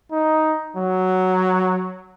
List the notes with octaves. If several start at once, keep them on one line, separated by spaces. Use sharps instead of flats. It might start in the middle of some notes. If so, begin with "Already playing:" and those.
D#4
F#3